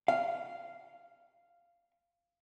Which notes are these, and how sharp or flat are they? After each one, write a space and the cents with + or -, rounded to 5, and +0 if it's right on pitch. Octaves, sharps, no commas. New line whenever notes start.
F5 -10